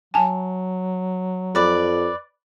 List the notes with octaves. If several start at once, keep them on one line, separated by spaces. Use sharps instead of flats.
F#3 G#5 A5
F2 B4 D5